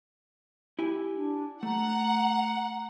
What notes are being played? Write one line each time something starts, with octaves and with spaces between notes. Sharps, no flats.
E4 G4 G#5
D4
A3 F#5 A#5